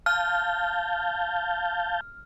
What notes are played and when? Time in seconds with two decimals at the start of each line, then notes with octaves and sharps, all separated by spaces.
0.06 F5 A5 F6 G6